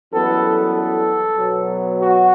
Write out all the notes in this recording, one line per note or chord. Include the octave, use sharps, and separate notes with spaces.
F#2 E3 G3 B3 A4
A4
B2 F#3 B3
F#4